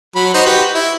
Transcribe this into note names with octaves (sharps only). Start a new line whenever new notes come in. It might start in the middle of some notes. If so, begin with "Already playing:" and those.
F#3 B5
D#4 F#4 C5
F#4 G4 B4
E4